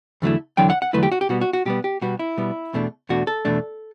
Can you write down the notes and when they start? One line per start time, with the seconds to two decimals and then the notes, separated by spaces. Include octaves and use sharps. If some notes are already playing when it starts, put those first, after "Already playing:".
0.22 E2 D3 F#3 A3 E4
0.57 E2 D3 F#3 E4 G5
0.70 F#5
0.82 F#5
0.93 E2 D3 F#3 A3 E4 B4
1.03 G4
1.12 F#4
1.21 G4
1.29 B2 G3 B3 F#4
1.41 F#4
1.53 F#4
1.66 B2 G3 B3 G4
1.84 G4
2.02 B2 G3 B3 F#4
2.19 E4
2.37 B2 G3 B3
2.73 E2 B2 A3 D4
3.09 E2 B2 A3 D4 F#4
3.27 A4
3.45 E2 B2 A3 D4